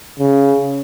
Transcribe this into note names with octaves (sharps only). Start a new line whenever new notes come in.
C#3